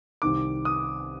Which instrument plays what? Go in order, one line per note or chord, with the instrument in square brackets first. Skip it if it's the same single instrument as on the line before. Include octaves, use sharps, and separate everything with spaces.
[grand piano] C2 C3 D#3 D6
D#6